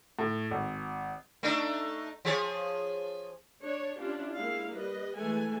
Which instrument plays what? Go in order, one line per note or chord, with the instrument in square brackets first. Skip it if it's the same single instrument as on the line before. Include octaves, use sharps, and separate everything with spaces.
[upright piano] A2
G#1
[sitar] A3 D4 D#4
F3 G#4 C#5
[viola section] D4 C#5
C#4 D4 E4 F4 G4
G#3 A#3 E4 F5
G3 B4 D#5
E3 G#3 A3 A4 B4 G#5